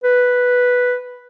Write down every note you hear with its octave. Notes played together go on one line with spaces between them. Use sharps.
B4